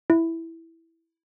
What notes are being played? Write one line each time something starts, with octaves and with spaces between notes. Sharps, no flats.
E4